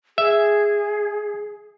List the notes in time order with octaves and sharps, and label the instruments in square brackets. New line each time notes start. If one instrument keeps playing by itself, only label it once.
[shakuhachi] G#4 [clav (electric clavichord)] E5